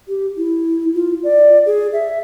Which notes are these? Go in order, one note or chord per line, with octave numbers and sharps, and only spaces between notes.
G4
E4
F4
D5
G#4
E5